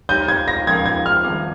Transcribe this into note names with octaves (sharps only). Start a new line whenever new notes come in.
G#3 D#4 G4 C#5 G6
G#6
A#6
F3 G#3 C#4 F4 A#4 G#6
G#6
F6
D#3 G3 C4